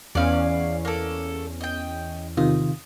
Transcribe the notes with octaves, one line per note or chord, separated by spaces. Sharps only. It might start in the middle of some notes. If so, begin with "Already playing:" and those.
E2 C#4 D5 F5
A#3 A4
D#5 G5
C3 D#3 F4 D#6